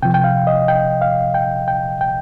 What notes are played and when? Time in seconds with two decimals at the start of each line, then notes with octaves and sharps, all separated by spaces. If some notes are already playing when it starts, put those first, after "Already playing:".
0.03 C3 F3 G5
0.14 G5
0.24 F5
0.47 D#5
0.68 G5
1.02 F5
1.34 G5
1.68 G5
2.01 G5